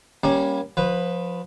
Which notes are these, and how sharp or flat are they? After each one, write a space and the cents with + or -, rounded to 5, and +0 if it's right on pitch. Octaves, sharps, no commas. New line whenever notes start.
G3 +5 A#3 +25 C#4 +0
F3 +25 B4 +0